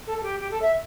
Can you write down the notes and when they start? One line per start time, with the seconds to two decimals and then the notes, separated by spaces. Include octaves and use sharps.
0.07 A4
0.18 A4
0.23 G4
0.40 G4
0.51 A4
0.62 E5